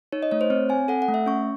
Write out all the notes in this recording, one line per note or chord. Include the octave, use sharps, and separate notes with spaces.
D#4 C#5
D#5
A3 C#5
C5
C4 C#5
C4 G#5
A4 F#5
F#5
A3
E5
C#4 C#6